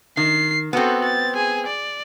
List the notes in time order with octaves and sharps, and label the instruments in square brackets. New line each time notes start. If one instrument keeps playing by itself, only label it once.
[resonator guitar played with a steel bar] D#3 [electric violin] C7
[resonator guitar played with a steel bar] B3 C4 [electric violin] F#4 A4
[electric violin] A6
G#4 G#5
D5